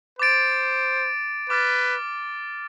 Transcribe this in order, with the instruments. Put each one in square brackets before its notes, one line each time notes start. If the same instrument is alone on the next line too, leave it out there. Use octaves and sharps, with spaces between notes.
[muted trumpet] C5 [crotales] D6 A6 D7
[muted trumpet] B4 [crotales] D6 F6 A6